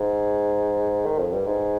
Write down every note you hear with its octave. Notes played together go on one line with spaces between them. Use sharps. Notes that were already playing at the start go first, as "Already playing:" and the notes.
Already playing: G#2
D#3
F2
G2
G#2